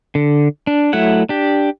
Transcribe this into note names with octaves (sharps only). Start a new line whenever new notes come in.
D3
D4
F#3 A3 E4 F#5
D4 G4